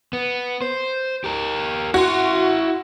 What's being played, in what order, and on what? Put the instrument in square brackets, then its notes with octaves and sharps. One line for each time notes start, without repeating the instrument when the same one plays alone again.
[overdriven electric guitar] B3
C5
G4 A#4
[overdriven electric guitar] E4 C6 [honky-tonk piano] F#4